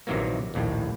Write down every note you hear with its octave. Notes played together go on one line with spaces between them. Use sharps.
A#1 C3 D#3 E3 F#3 A#3
A#1 D#2 A2